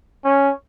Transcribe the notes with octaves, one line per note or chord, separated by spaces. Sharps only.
C#4